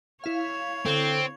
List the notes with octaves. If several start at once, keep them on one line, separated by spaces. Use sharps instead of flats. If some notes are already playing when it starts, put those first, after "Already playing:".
E4 C#5 F5
D3 C4